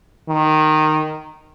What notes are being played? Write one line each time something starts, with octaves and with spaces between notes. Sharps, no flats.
D#3